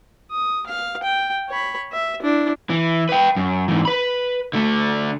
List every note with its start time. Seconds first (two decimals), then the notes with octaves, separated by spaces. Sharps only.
0.31 D#6
0.67 F5
1.03 G5
1.49 C#5 B5
1.93 E5
2.22 D4 E4
2.70 E3
3.09 B4 G5
3.36 F#2
3.68 G#2 E3
3.85 B4 B5
4.53 D3 A3